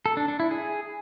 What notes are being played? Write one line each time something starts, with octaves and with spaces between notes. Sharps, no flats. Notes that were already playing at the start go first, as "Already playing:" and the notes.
A4
D4
D4
E4
G#4